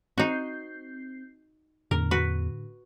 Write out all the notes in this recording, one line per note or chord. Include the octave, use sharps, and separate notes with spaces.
C4 D#4 F#4 G6 C7
E2 A2 D3 A#4
F#4 B4